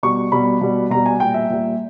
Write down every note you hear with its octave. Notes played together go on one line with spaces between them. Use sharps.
B2 G3 C#6
B2 G3 B5
B2 G3
B2 G3 A#5
G#5
A#2 G3 G5
E5
A#2 G3